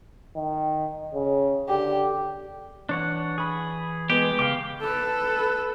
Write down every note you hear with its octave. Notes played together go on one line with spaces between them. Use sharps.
D#3
C#3
D3 G4
E3 D4 C#5 F#5
G#4 B5
G#3 B3 G4
C#3 F5 G5 D6
A4 B4